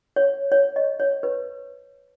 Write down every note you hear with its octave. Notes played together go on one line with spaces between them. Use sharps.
C#5
C#5
D#5
C#5
B4